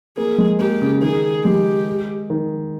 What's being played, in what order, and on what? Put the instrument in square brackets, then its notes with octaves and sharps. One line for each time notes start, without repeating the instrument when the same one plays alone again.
[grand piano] A#3 [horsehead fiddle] G#4
[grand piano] G#3
[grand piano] A#3 [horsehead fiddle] G4
[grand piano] C#3
[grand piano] D#3 [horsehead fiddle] G#4
[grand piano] G#3 [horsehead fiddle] G4
[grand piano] D#3